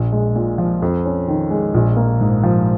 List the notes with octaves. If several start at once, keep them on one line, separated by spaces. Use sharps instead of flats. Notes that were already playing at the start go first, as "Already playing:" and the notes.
Already playing: A#1
G#3
A#2
F3
F2
C#4
D#3
G#3
A#1
A#3
G#2
F3